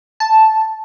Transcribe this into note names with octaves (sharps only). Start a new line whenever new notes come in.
A5